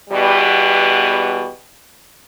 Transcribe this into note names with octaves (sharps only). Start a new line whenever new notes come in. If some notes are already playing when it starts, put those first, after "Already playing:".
E2 B2 G3